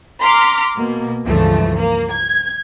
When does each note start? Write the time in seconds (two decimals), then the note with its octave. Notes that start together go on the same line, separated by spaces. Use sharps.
0.21 A#5 C6 D6 F6 B6
0.76 B2 A#3
1.25 C#2 G2 E3 F3 A3
1.78 A#3
2.11 G#6